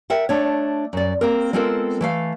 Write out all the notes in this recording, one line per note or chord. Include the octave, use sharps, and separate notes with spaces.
A#4 E5 F#5 G5
A3 D4 C#5
F#2 D5
A#3 C4 A#4
G#3 B3 C4 F4 A4 A#4
E3 A3 F5